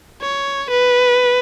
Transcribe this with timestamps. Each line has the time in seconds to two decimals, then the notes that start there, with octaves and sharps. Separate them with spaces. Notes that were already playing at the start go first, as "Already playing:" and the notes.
0.21 C#5
0.70 B4